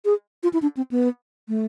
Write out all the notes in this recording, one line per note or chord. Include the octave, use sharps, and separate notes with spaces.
G#4
F4
E4
D4
C4
B3
A3